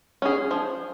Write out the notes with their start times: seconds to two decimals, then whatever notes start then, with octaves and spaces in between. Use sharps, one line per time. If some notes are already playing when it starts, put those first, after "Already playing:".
0.22 C#4 G#4
0.51 F3